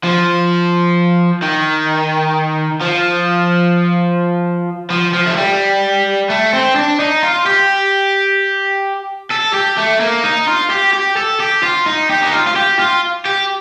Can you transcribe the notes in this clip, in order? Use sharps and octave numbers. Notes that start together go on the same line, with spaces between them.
F3
D#3
F3
F3
F3
A3
G3
A3
C4
D4
D#4
F4
G4
A4
G4
A3
A#3
D#4
F4
G4
G4
A4
G4
F4
D#4
G4
D#4
F4
F4
G4
F4
G4